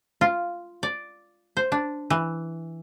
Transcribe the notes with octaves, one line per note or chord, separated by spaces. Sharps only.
F4
D5
C5
D4
E3